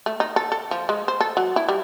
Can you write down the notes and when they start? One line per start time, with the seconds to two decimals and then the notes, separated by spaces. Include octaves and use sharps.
0.06 A3
0.20 D#4
0.36 A4
0.52 A4
0.71 F3
0.89 G#3
1.08 C5
1.20 A4
1.37 F#3
1.56 E4
1.68 G3